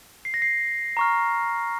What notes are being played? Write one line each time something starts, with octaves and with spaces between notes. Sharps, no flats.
C7
A#6
C7
A#5 C#6 F6